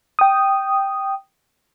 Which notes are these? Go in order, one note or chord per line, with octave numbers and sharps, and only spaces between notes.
G5 D#6